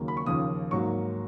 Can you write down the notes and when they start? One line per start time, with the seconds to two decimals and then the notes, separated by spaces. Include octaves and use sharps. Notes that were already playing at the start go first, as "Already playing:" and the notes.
Already playing: D#2 C#3 F#3 A#3
0.08 B5
0.17 C#6
0.26 D#2 C#3 F3 D#6
0.71 G#2 F#3 A#3 C#6